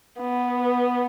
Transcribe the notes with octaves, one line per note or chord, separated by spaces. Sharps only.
B3